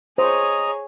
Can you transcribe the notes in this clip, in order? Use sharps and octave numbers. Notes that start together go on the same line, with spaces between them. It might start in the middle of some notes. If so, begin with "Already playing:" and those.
G#4 C5 C#5 D#5 A#5